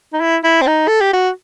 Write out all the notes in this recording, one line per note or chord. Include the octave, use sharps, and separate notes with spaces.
D#4
E4
E4
C4
D#4
A4
G4
F#4